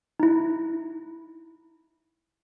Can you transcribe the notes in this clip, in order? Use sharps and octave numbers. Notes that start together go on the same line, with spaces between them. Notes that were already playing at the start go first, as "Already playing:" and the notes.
D#4 E4